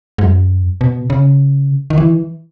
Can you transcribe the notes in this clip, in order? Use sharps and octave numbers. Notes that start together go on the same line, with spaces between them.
G#2
F#2
B2
C#3
D#3
E3